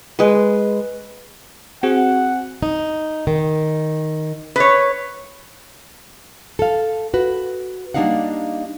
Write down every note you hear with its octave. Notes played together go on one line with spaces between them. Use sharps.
G#3 B4
C4 F#4 G#4 F#5
D#4
D#3
B4 C#5
A4 F5
F#4 B4
G3 A#3 D4 D#4 F5 F#5